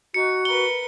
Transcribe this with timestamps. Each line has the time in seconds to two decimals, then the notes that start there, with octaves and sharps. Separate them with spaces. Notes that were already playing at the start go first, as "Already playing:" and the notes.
0.14 D#4 F#4 C#7
0.45 A#4 B4 G7